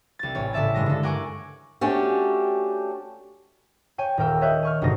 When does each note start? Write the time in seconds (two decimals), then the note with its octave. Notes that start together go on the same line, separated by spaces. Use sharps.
0.19 C2 A6
0.35 A1 C#5
0.53 A2 C#3 D5 E5 A5 A6
0.74 G2 C#3 G#3 A#6
0.86 D3 A4
1.03 A#4 F#5 G#5 C#6 D6
1.81 A3 C#4 D4 F#4 G4
3.98 C#5 G5 G#5
4.18 D#1 A#4 G5 E6
4.41 C#5 D#5 E5 F#6 G6
4.63 G#5 C#6 F6
4.82 G#1 G2 B2 D3 D#4 A#6